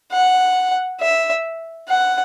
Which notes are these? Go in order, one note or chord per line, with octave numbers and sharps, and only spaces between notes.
F#5
E5
F#5